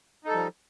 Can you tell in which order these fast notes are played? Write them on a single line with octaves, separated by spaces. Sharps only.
D#4 A4 G3 F3